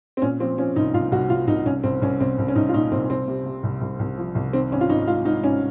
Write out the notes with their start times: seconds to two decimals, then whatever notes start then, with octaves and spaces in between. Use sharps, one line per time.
0.17 C4
0.22 A#2 C#4
0.40 F3 C4
0.58 F3 C#4
0.76 C2 D#4
0.94 C2 F4
1.12 C2 F#4
1.30 C2 F4
1.48 C2 D#4
1.65 C2 C#4
1.84 C2 C4
2.02 C2 C#4
2.20 C2 C4
2.38 C2
2.48 C#4
2.56 C2 D#4
2.69 F4
2.74 A#2 D#4
2.92 C2 C4
3.10 C2 C4
3.28 C3
3.46 C3
3.63 C2
3.81 C2
3.99 C2
4.18 F3
4.35 C2
4.53 D#3 C4
4.72 G#1 C#4
4.81 F4
4.89 G#1 D#4
5.07 G#2 F4
5.25 G#2 D#4
5.43 G#1 C#4